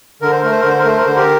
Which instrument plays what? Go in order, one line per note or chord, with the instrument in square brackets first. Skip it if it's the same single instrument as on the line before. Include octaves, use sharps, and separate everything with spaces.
[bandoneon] D3 A#4
C5
A3 A#4
C5
D3 A#4
C5
A#4
A3 C5
A#4
D3 C5
G4 A#4